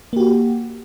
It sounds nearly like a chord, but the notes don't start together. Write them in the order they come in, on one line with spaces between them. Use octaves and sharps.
A#3 G4 F#4